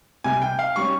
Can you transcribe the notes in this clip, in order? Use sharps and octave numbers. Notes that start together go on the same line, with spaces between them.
C2 C3 G3 G#5
G5
F5
G3 C#4 C#6